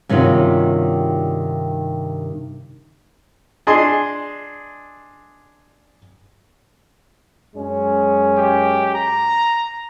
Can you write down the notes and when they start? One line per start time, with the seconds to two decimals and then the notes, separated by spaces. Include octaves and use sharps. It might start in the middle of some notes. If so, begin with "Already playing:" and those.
0.09 G2 C3 D#3 C#4 F4 F#4
3.67 D4 G#4 D#5 C6
7.55 F#2 G#3 C#4
8.38 G4
8.94 A#5